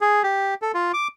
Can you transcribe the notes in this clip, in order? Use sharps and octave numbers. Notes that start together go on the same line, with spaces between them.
G#4
G4
A4
F4
D6